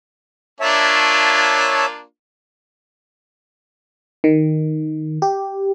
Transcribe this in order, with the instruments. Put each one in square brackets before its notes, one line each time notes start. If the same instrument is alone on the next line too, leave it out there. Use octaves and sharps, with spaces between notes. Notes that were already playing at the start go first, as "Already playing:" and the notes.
[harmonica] A#3 D4 F4 [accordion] C#5 E5 A5
[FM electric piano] D#3
G4